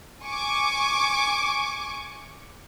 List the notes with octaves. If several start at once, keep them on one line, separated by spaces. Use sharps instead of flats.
G#5 C#6 D6